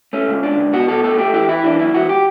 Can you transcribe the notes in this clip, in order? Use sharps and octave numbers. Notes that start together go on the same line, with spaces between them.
A3 C#4
C#2
C#2 D4
C#2
B2 F#4
B2 A4
A3 A4
A3 G4
E3 G4
E3 E4
E3 D4
F#2 E4
E2 F#4
G4